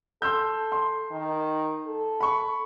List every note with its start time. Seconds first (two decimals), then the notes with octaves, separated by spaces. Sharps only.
0.22 A4 C6 E6 G6
0.72 C6
1.11 D#3
1.87 A4
2.20 B5 C#6